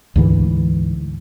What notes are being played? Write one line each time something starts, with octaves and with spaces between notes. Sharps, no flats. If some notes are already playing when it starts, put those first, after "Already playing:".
D2 G#2 E3